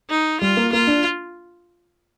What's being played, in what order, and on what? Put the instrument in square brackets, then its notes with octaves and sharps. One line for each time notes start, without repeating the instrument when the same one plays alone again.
[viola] D#4
[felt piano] G3 [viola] F4
[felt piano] A#3
[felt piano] A#3 [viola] F4
[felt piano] D4